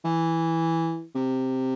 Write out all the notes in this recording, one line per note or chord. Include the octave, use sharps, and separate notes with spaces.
E3
C3